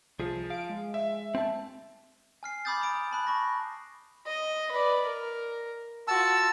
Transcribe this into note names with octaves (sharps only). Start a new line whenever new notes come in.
C2 F3 G#4
F5 D7
G#3
E5
C4 A5
G#5 F6 C7
B5 D6 D#6 G6 A6
A#5 D#6 D7
A5 B5 F#6
B5 C#6 A#6
D#5
B4 D5
A#4
F4 F#4 A5 E6